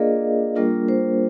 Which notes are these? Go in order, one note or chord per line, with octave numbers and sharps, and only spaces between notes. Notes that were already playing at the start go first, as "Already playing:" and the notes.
Already playing: A#3 D4 F4 G#4 A#4 D5 D#5 F5
G3 A#3 D4 F4 A#4
C5